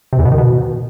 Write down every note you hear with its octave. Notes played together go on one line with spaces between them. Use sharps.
C3
E2
B2
D#3
B2